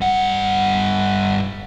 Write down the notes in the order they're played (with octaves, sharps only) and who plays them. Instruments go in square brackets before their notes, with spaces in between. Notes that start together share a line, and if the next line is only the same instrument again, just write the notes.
[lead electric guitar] G2 F#5